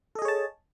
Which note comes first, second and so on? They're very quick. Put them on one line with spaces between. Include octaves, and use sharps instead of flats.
A4 D#5 G#4 C#5 A5